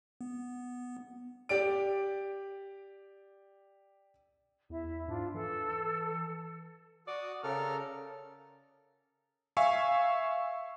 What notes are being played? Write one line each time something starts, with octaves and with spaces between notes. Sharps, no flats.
B3
G4 D5 D7
E2 E4 E5
G#2 D4 F4
E3 A4
F#4 D5 C#6 D#6
C#3 A4 A#4 F6
E5 F5 G#5 C#6 E6